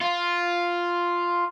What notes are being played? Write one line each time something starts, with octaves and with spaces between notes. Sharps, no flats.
F4